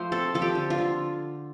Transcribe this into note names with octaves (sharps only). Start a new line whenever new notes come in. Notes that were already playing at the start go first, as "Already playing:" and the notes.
Already playing: F3 A3 C5
C4 A4
F3 A4
G4
D3
F4
D3